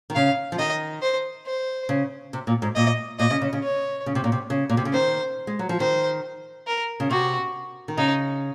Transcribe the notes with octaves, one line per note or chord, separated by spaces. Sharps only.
D#3
C#3 F5
F3
D#3 D#5
C5
C5
C#3
C3
A#2
G#2
A#2 D#5
A#2 D#5
C#3
C#3
C#3
C#5
C#3
C3
A#2
C3
C#3
A#2
C3
C#3
D#3 C5
G#3
F#3
F3
D#3 C5
A#4
C#3
C3 F#4
D#3
C#3 D#4